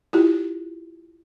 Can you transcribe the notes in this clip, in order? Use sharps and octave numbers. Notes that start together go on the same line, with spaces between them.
E4 F4 G4